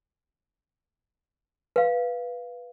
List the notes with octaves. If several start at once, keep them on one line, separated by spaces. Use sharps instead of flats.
B4 F5